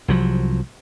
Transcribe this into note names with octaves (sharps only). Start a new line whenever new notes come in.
C2 F3 F#3